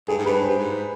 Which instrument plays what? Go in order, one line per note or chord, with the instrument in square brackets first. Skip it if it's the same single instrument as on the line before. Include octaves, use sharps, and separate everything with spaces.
[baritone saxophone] G2 [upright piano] G#4
[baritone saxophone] G#2
[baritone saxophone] G2 [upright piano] B4
[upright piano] C5
[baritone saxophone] G2
G#2